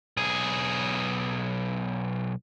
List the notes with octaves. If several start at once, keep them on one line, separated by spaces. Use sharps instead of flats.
B1 G#4